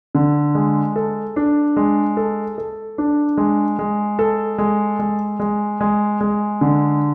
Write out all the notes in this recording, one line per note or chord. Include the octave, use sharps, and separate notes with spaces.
D3
G#3
A4
D4
G#3
A4
A4
D4
G#3
G#3
A4
G#3
G#3
G#3
G#3
G#3
D3